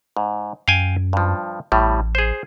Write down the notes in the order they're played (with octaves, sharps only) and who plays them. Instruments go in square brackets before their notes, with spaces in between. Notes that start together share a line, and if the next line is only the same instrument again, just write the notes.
[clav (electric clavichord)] G#2
[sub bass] F#2 [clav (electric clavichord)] F5 G5 G#5
[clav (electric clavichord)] G2 F3
[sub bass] A1 [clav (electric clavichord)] A2 G3
[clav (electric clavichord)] G#4 C5